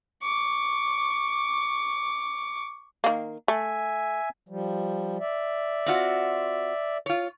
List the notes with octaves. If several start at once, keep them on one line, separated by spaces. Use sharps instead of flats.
C#6 D6
D#3 A#3
A3 E5 G#5
F3 G3
D5 E5
C4 F4 F#4
F4 C#5